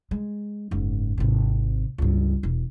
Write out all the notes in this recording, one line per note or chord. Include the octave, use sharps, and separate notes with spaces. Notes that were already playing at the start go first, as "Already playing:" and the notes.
G#3
F#1 G#2
G#1 C3
C#2 G2
E1